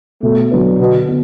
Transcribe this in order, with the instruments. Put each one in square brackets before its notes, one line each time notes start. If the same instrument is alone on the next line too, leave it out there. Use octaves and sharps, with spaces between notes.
[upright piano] B2 [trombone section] A3
[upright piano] F#3 D4 B4
[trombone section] B2 [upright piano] D3
[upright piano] B3